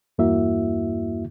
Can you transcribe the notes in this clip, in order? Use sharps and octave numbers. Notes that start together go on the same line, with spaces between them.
E2 G2 A#3 E4 F#4 E5